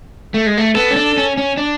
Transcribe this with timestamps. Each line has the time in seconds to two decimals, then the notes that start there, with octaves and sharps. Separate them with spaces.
0.34 A3
0.46 G#3
0.58 A3
0.75 B3 A4
0.91 C#4
0.96 D4
1.17 C#4
1.37 C#4
1.57 D4